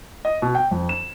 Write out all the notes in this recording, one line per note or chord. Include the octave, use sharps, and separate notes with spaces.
D#5
B2
G5
F2
E7